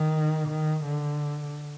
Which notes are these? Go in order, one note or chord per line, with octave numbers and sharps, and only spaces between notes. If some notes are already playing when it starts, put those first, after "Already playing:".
Already playing: D#3
D#3
D3